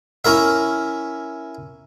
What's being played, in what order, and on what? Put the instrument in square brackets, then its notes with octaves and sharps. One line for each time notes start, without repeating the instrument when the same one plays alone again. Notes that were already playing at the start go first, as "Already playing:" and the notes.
[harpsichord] C#4 E4 A#4 E5